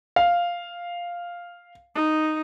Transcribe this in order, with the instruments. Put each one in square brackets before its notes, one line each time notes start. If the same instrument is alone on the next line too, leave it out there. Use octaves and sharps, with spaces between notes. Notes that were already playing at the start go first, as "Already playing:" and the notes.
[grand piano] F5
[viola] D#4